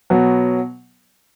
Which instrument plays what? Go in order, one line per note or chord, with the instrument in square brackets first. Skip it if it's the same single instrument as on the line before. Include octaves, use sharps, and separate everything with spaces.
[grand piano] B2 F#3 B3